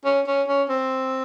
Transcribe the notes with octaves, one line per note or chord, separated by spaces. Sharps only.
C#4
C#4
C#4
C4